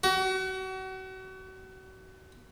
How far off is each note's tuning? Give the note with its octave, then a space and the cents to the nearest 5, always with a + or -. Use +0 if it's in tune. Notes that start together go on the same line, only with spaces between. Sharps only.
F#4 +35